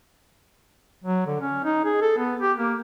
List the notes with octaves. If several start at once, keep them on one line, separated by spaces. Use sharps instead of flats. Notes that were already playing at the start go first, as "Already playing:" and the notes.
F#3
D3
C#4
D#4
G#4
A4
B3
G4
A#3